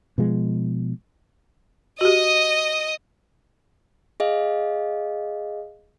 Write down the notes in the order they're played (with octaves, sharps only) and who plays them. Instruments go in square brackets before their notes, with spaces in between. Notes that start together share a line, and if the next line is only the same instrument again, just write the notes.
[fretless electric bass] B2 F3 G#3
[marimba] F#4 G4 [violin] D#5 D#6
[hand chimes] G#4 D#5 F5